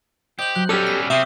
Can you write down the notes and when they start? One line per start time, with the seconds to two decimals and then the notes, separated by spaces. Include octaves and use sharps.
0.39 G4 C5 D#5 G6 F#7
0.55 F#3 F#6
0.69 G3 C#4 G4 A4 D6 E6 F6
0.87 B3 B6
1.10 C3 C4 E5 C#6 D#6 G7